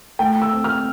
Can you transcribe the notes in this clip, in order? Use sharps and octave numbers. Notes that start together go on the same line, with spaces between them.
A3 G5
E6
C4
F6